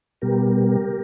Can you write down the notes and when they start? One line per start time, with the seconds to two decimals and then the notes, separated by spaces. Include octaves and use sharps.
0.22 B2 G3 B3 G4 A#4